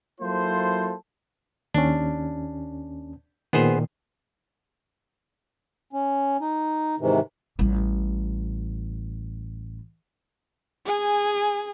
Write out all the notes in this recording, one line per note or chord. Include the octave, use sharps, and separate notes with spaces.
F#3 A#3 E4 F4 A4 C5
D#2 C#4 D4
A#2 D#3 B3 G#4 C5
C#4
D#4
G#2 C3 D#3 E3
A1 G3
G#4 G#5